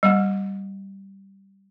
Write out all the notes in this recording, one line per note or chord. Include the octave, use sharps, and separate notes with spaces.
G3 A#3